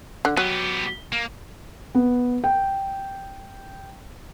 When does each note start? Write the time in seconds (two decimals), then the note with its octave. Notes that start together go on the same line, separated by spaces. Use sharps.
0.25 D3
0.37 F#3 B3 G4
1.12 A#3
1.95 B3
2.44 G5